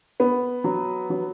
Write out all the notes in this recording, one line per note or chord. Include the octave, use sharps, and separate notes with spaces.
B3
F#3
F#3